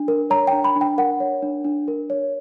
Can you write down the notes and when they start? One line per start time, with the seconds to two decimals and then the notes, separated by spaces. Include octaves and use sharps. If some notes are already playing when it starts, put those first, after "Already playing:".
Already playing: D4
0.08 A#4
0.30 C#5 A#5
0.47 G5
0.53 D4
0.64 B5
0.75 D4
0.81 G5
0.98 A#4 F#5
1.20 C#5
1.42 D4
1.64 D4
1.88 A#4
2.10 C#5